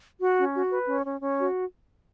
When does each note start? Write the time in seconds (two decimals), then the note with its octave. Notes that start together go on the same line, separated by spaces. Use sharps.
0.21 F#4
0.37 C#4
0.54 F#4
0.71 B4
0.88 C#4
1.06 C#4
1.22 C#4
1.38 F#4